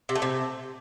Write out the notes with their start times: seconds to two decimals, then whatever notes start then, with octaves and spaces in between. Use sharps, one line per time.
0.09 C3
0.15 A3
0.22 C3